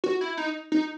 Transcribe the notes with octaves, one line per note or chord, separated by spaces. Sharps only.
F#4
E4
D#4
D#4